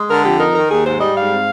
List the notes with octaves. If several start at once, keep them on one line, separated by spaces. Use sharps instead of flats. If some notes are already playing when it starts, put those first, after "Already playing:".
Already playing: G#3
D3 A#4
F2 G4
D#4 A#4
D#3 A#4
D#2 G#4
G#2 C5
G3 D#5
G#2 F5
C4